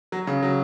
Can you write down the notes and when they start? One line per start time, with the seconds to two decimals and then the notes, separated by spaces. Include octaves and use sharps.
0.12 F#3
0.27 C#3
0.43 F#3